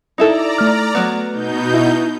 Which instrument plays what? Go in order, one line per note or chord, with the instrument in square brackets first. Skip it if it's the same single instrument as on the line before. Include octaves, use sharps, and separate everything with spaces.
[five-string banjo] D#4 E4 A4 [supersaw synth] D5 A#5
[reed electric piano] A3 F6
[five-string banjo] F#3 B3
[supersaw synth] B2 D#4 G6
[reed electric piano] E4